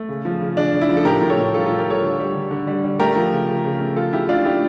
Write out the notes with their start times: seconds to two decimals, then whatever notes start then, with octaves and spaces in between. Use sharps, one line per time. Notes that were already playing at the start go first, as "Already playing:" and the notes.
Already playing: A3
0.09 C#3
0.25 F3
0.41 C#3
0.57 C#3 D4
0.73 C#3
0.81 E4
0.89 F3
0.97 A4
1.05 A2 G4 A#4
1.22 A2
1.30 A4 C#5
1.38 A2
1.54 G3 F4 A4
1.66 A2 F4 A4
1.78 G4 A#4
1.86 G3 A4 C#5
2.03 D3
2.19 G3
2.35 D3
2.51 D3
2.67 G3
2.84 G3
2.99 A3 G4 A#4
3.16 F3
3.32 C#3
3.48 C#3
3.64 C#3
3.80 A3
3.96 F3 F4 A4
4.13 C#3 E4 G4
4.29 A3 D4 F4
4.45 A3 E4 G4